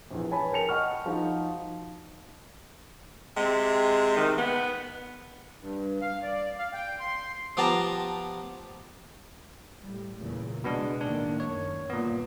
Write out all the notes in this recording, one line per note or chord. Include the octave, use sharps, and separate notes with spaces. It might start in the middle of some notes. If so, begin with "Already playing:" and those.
A#1 E2
B4 C#5 G#5 A5 B5
A#4 G5 A5 C#7 F7
D#5 F#5 C#6 F6
F3 D#4 F#4
C3 G#3
D#3
B3
G2
F5
D5
F5
G5
C6
F3 B3 G4 A5 A#5
A2 G3
E2 A#2 C#3
B2 G#3 B3 D4
A2 D#3 A#3 D4
F#2 D#3 C#5
G1 A#2 B3